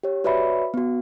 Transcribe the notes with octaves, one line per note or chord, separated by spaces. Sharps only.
G4 C#5
F#4 B4 C#5 D5 E5 B5
B3 F#4